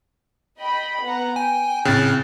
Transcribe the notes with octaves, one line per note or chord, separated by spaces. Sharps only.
D#5 G5 B5
B3 F#5 A#5
G5 G#5
A2 C#3 C4 F#6 A6